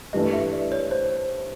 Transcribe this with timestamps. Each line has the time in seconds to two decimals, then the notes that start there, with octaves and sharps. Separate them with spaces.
0.13 G2 E3 A3 D#5
0.33 E5
0.53 D5
0.72 C#5
0.91 C5